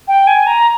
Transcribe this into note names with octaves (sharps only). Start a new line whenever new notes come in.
G5
G#5
A#5